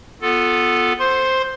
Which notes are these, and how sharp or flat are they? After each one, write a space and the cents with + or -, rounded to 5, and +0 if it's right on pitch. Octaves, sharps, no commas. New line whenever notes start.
B3 +0 F4 +15 A4 +0
C5 +0 C6 +10